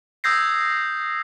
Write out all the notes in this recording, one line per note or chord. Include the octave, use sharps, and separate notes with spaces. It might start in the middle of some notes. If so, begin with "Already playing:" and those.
D#6 E6 G6 G#6 A#6 C7